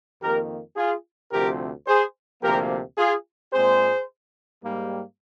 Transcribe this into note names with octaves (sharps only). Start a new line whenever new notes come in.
F2 D#3 A#3 G4 A#4
F4 G#4
D2 C3 F3 C4 G4 A#4
G#4 C5
D2 C3 F3 A#3 G4 A#4
F4 G#4
A#2 G#3 C4 G#4 C5
G#2 G3 A#3